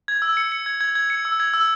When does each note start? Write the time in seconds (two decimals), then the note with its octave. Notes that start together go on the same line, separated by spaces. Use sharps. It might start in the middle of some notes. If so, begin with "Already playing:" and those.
0.08 G#6
0.22 E6
0.37 C#7
0.52 C#7
0.66 G#6
0.81 G#6
0.95 G#6
1.10 C#7
1.25 E6
1.40 G#6
1.54 E6